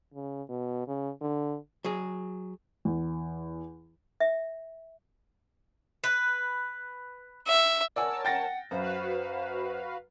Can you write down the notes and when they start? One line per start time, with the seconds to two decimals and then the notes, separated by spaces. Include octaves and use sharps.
0.14 C#3
0.49 B2
0.87 C#3
1.21 D3
1.84 F#3 G#4
2.85 E2
4.20 E5
6.04 B4
7.47 E5
7.96 A#4 C#5 D5 F#5 G#5 A5 E6
8.25 F#5 G5 A6 A#6
8.71 F#2 F#4 B4 C5 F5